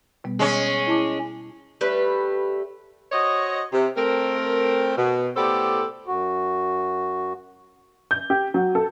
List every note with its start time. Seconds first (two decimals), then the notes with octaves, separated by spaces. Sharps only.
0.24 B2 G3 B3
0.39 G#3 C#4
0.87 E4 A5 D6
1.81 G3 A3 B4
3.12 F#4 C5 C#5 D#5
3.73 C3
3.96 A3 C4 A#4
4.97 B2
5.36 A2 B3 G4 A4 C5 D5
6.07 F#2 F#4
8.11 G6
8.30 G4
8.54 F#3
8.75 A4